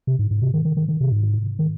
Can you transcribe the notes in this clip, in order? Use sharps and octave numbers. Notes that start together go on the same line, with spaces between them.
C3
G#2
G#2
C3
D#3
D#3
D#3
D#3
C3
G#2
D#3